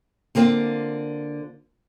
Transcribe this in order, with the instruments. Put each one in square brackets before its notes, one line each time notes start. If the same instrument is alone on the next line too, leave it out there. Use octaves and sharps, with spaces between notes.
[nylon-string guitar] D3 A#3 C4 F4